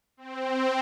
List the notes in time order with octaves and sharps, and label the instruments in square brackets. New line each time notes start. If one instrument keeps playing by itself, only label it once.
[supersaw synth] C4